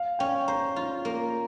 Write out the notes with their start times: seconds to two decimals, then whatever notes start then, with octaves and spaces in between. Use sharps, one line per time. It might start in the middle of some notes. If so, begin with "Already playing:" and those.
Already playing: F5
0.19 C#4 G5
0.48 C5 A#5
0.76 F4
1.05 A#3